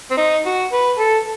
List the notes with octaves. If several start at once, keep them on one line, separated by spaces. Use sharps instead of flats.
C4
D#4
F#4
B4
A4